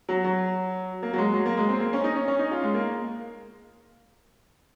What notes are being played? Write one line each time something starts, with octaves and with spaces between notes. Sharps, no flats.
F#3
F#3
A#3
F#3
G#3
F#3
A#3
G#3
C4
A#3
C#4
D#4
C#4
C#4
D#4
F4
G#3
A#3